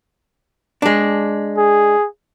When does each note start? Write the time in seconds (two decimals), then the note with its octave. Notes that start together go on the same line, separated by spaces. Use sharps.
0.82 G#3 D4
1.57 G#4